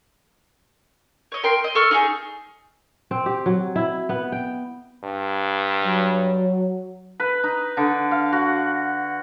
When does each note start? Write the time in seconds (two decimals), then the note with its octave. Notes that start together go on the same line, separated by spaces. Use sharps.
1.32 C#5 D#5
1.44 A#4 G5 C6
1.64 D#5
1.75 A4 C#6 F6
1.91 D#4 F#4 G#4
3.11 C4
3.26 G4
3.46 F#3
3.76 E4
4.09 B3
4.32 G5
5.04 G2
5.85 F#3
7.20 B4
7.44 D#4
7.77 D3
8.11 F5
8.33 F#4